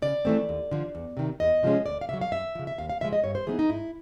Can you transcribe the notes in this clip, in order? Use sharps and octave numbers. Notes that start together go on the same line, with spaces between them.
C#3 D5
E3 A3 C4
D#2
D3 F3
E2
C3 D#3
E2 D#5
C3 F3 G#3 C#4
D2 D5
F5
C#3 F#3 E5
F5
F#2 E5
C#3 F3
E5
D#2 F5
F5
C#3 F3 G#3 E5
D#5
G2 C#5
C5
E3 G3 B3 D#4 G#4
D#4
G#2 E4